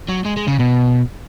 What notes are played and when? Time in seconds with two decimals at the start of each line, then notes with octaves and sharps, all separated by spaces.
0.08 F#3
0.25 G#3
0.37 G#3
0.47 C#3
0.59 B2